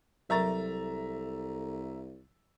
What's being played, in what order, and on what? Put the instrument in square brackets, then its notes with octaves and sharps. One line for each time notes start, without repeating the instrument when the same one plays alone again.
[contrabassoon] C2 [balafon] F#3 A#4 C#6 [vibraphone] A4 [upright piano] E5 A#5 A6